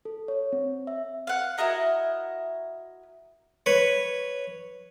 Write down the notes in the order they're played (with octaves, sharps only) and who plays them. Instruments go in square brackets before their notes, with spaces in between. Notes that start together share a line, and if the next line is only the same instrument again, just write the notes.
[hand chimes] A4
C#5
C4
E5
[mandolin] F5 F#5
E4 F#4 A#4 D#5
[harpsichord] B4 C#5